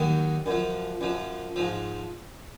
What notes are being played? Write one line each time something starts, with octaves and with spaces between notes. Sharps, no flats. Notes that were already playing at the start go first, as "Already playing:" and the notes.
Already playing: D#2 D#3 F#3
F#2 F3
F#2 F3
G#2 F3